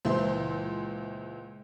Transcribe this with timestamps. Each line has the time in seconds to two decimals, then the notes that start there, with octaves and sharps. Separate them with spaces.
0.05 C#2 A#2 E3 E4 C5 C6